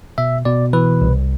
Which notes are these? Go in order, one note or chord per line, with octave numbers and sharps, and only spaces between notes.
B2 E5
B2 D5
E3 B4
C2